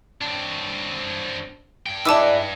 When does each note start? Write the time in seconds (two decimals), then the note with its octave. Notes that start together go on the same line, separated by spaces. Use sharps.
0.21 C4 D4
1.86 G2 G5
2.05 G#3 D#4 E4 B4 D5 A5 D6 E6